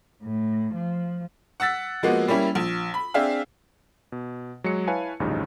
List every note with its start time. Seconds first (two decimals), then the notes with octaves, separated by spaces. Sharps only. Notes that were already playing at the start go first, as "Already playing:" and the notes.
0.23 A2
0.74 F3
1.60 F#5 E6 A6 B6
2.03 F3 G#3 A#3 B3 F#4
2.28 G3 A#3 C#4 E4
2.55 A#1
2.94 B5
3.14 C4 D4 G#4 E5 F5
4.12 B2
4.64 F#3 G#3 C#7
4.88 E4 B4 C#5 F5 G#5 A5
5.20 A1 D2 G2 C#3 F3 D#4